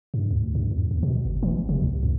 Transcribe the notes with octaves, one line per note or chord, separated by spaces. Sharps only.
G2
D2
G2
E2
D#2
B2
F#1
E3
F1
C3
C#2
F2